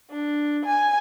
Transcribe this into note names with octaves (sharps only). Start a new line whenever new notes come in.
D4
G#5